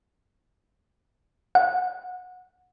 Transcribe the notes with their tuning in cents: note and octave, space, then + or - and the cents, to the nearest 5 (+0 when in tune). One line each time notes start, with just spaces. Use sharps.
F#5 -25